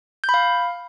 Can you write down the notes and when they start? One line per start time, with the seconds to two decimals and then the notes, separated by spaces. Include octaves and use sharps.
0.24 G6
0.29 B5
0.34 F5